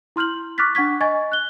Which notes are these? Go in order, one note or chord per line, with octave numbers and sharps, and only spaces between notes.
E4 C6 F6 G6 F#7
C#6 D6 F6 F#6 A6 B6
D4 F#5 C#6 G#6 B6
D#5 G#5 C#6 G#6 A6
F#6 G7